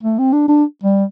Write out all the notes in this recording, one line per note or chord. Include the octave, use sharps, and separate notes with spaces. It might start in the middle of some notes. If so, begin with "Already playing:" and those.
A3
C4
D4
D4
G3